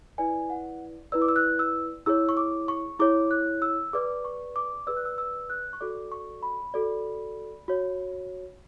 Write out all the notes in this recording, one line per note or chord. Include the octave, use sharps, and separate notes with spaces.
E4 B4 D5 G#5
F#5
E4 B4 D5 E6
D6
E6
F#6
E6
E4 G#4 C#5 E6
C#6
D6
C#6
E4 G#4 C#5 D6
F#6
E6
G#4 B4 D5 D6
C#6
D6
G#4 B4 D5 E6
F#6
E6
E6
F#6
C#6
F#4 A4 D5 D6
C#6
B5
F#4 A4 D5
F#4 C#5